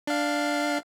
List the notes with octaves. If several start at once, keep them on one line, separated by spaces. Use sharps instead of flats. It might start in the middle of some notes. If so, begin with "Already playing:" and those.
D4 F5